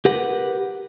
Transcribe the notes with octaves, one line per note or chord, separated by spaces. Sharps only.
G4 A#4 B4 F#5